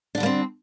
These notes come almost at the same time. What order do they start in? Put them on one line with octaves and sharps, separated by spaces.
D4 D3 G3 A#3 C4